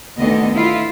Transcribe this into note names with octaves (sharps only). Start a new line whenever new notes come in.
D2 D3 D#3 B3 D#5
E4 F4